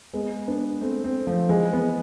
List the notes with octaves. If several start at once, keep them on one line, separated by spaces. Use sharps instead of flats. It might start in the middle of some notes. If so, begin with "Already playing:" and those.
G#3 B3
B3 D4
A3 C4
A3 C4
F3 A3
E3 G#3
G#3 B3